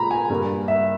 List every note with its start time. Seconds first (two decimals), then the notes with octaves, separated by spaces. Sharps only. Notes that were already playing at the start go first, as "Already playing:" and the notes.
Already playing: A#2 A#3 A#5 B5
0.11 G#5
0.29 G2 G3 A#3
0.68 E5